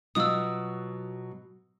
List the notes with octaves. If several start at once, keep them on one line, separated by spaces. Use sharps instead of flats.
B2 F#3 F4 D#6 E6